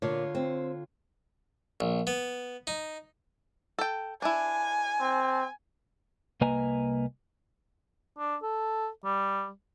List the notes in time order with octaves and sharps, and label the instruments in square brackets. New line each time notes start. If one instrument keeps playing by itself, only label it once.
[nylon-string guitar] A#2 [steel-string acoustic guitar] D3 F4 C#5
[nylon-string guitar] C4
[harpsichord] A#1
B3
D#4
[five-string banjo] A4 G5
[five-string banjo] D4 E4 [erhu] G#5
[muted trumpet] C4
[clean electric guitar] C2 A#3 B4 D#5 G#5 A#5
[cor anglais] D4
A4
G3